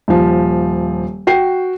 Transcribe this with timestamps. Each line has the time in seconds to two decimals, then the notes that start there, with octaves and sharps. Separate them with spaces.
0.08 D#1 F3
1.27 F#4 G5 C7